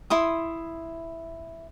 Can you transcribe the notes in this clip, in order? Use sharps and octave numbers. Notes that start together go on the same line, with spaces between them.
E4 C6 D#6